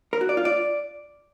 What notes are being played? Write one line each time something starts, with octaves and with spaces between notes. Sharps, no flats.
A#4
F#4
D5
F4
D5